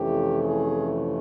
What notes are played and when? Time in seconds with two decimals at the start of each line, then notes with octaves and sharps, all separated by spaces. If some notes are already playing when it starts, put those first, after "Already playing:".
Already playing: F2 C3 E3 A3 C#4 G4
0.44 G#4